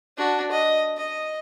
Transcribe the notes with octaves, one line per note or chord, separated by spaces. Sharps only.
D4 F#4
D#5
D#5